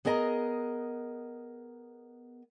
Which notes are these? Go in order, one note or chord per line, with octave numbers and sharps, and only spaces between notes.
B3 G#4 A#4 D#5 A5 A#5